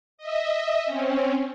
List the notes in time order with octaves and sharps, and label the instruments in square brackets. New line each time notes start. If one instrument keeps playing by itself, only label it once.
[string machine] D#5 E5
C4 C#4